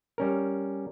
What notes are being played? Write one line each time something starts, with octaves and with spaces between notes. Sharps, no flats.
G3 C#4 A#4